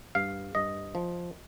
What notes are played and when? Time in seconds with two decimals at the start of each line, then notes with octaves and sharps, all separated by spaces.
0.15 G2 F5
0.55 G2 D#5
0.95 F3